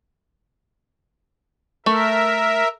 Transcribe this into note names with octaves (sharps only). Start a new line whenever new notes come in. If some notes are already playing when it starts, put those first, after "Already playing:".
A3 A#4 E5